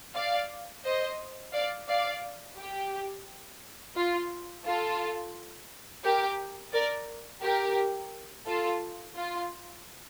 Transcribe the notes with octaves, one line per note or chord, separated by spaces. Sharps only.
D5 F5
C5 D#5
D5 F5
D5 F5
G4
F4
F4 A4
G4 A#4
A#4 D5
G4 A#4
F4 A4
F4